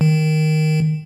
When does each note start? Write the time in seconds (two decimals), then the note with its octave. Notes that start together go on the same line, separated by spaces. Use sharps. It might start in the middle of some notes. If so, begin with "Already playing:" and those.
0.01 D#3